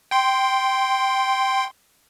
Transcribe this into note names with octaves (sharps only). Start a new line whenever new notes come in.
G5 C6